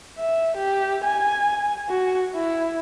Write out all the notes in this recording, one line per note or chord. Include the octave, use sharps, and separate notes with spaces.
E5
G4
G#5
F#4
E4